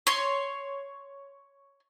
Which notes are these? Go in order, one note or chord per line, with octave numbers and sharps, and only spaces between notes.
C#5 C6